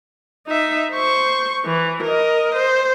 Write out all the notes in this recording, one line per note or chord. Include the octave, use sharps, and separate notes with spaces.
D#4 E5
C5 C#6
E3
A#4 D#5
C5